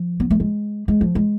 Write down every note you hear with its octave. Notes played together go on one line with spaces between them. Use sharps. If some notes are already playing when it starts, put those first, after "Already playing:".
Already playing: F3
B3
A3
G#3
G#3
F3
G#3